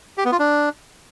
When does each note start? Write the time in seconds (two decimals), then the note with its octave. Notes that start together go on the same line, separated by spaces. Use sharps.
0.18 G4
0.25 B3
0.32 F4
0.39 D4